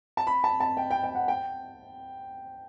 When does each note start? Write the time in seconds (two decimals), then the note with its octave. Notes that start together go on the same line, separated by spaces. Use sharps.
0.17 A5
0.27 B5
0.44 A5
0.60 A5
0.77 G5
0.91 G5
1.03 G5
1.15 F#5
1.28 G5